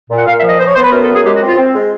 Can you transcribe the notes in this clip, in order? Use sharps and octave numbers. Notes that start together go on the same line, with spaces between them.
A#2
F#5
A#2 F5
E5
F3
D#5
B3 C5
C#5
B3 C5
B4
F#2 A#4
A4
F#2
G#4
G#3 G4
F#4
C4
F4
C4
G#3